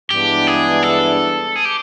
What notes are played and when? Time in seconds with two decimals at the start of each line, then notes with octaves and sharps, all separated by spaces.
0.10 G2 E3 G#3 B3 D4 G4
0.47 G#4
0.83 A4
1.56 G#4
1.65 G4